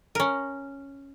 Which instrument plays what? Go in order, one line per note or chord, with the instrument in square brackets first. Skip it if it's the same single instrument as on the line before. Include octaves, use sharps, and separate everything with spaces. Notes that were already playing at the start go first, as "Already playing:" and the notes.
[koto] C#4 A#4